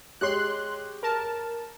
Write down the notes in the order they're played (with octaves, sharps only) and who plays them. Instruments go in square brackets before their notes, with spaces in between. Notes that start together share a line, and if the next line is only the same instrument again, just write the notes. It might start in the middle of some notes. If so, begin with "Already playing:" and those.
[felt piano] G#3 G4 C#5 [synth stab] C6 F#6
[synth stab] A#4 A5